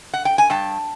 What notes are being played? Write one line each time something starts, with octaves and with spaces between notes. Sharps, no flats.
F#5
G5
G#5
G2 G5 A5